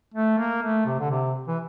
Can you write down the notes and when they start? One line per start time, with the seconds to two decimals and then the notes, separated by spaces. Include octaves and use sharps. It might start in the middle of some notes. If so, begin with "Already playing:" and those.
0.14 A3
0.38 A#3
0.63 A3
0.86 C3
0.99 D3
1.11 C3
1.48 E3